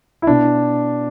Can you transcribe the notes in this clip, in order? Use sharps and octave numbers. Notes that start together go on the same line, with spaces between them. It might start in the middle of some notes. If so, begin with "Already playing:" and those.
E4
B2 D4